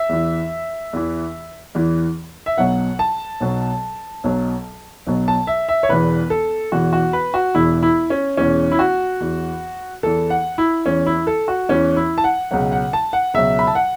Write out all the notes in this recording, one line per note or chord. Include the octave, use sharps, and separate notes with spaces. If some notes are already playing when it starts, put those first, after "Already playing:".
Already playing: E5
E2 E3
E2 E3
E2 E3
E5
B1 B2 F#3 F#5
A5
B1 B2 F#3
B1 B2 F#3
B1 B2 F#3
A5
E5
E5
C#5
E1 E2 E3 B4
A4
E1 E2 E3 F#4
F#4
B4
F#4
E1 E2 E3 E4
E4
C#4
E1 E2 E3 C#4
E4
F#4
E2 E3
E2 E3 A4
F#5
E4
E2 E3 C#4
E4
A4
F#4
E2 E3 C#4
E4
A5
F#5
C#2 B2 F#3 F#5
F#5
A5
F#5
C#2 B2 F#3 E5
B5
A5
F#5